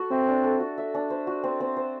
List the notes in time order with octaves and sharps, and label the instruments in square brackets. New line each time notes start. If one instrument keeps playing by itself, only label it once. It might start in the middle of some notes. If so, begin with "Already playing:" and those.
Already playing: [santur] F#4 A4
[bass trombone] C4 [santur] E5
[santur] D4
A4
F#4
E5
D4
C5
F#4
C4
C4
C5